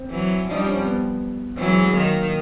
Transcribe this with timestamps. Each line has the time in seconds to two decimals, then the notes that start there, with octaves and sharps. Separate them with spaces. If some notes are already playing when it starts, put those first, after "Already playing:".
Already playing: C4
0.10 E3 F#3
0.47 F3 G3 D#4
0.56 D4
0.66 C#4
0.74 C4
0.84 B3
1.57 E3 F#3 C4
1.69 G#3
1.82 G#3
1.93 D#3 A#3